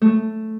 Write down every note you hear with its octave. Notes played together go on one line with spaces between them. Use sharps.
A3